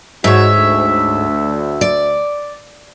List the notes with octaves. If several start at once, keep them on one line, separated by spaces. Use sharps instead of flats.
G#2 D#4 F#4 C#5 E5
D2
D5